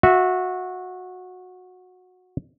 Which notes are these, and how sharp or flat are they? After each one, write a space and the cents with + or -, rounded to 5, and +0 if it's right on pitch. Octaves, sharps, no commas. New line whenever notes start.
F#4 -15 E5 -5